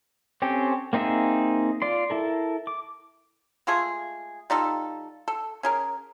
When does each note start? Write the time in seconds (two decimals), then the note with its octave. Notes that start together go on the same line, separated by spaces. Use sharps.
0.42 C4 C#4 G4 A4
0.93 A#3 C4 D#4 G#4 E5
1.82 F4 D5 C6
2.10 E4 A4 A#4
2.67 D6
3.67 G#3 A3 F4 G#4
4.50 G3 D#4 F4 A4
5.28 A4
5.63 C#4 G#4 A#4